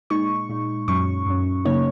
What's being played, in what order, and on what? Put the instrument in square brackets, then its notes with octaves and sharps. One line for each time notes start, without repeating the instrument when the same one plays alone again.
[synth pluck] A#2 G#3 D#4 C#6
A#2 G#3 D#4
F#2 F#3 C#4 C#6
F#2 F#3 C#4
C#3 F#3 A#3 D#4 C#5